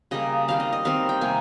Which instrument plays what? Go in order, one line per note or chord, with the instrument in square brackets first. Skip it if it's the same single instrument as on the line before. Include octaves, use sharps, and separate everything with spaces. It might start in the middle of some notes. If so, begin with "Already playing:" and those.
[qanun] C#3 G3 A#3 D#5
D#3 G3 C4 F5
D#5
D#5
D#3 G3 C4 F5
G5
C3 G3 A#3 G#5